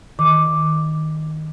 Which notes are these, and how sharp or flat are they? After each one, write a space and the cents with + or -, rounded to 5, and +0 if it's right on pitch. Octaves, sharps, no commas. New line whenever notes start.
D#3 +0 D6 +0